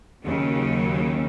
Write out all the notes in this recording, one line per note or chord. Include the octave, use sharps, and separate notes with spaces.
D#2 C#3 F#3